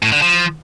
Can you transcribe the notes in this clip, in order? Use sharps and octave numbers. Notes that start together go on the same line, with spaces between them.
A2
D3
F3